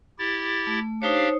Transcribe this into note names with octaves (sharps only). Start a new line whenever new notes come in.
E4 G4 A6
A3
D4 D#4 G4 C5 C#5 F5